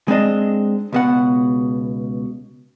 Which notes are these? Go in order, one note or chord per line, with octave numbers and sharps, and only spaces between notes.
G#3 C4 D4 D#5
C#2 B2 F#5